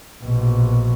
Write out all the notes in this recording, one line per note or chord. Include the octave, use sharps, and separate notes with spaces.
A#1 B2